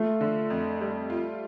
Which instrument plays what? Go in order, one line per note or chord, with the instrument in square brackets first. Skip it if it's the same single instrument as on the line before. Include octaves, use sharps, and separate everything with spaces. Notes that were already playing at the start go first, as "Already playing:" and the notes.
Already playing: [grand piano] A3 [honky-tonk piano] F4
[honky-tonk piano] D3
F2
G3
F4